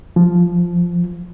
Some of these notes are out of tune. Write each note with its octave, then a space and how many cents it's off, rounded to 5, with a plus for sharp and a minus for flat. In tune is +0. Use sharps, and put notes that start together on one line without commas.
F3 -5